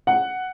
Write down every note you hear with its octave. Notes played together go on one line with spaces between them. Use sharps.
F#5